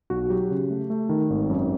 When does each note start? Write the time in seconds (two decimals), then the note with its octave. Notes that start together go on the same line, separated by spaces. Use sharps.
0.10 B1 F#4
0.30 F#3 G4
0.50 C#3
0.70 A3
0.90 A3
1.09 D#3
1.30 G#1
1.50 F#2